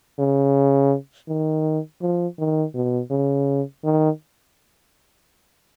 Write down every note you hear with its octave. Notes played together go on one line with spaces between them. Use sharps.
C#3
D#3
F3
D#3
B2
C#3
D#3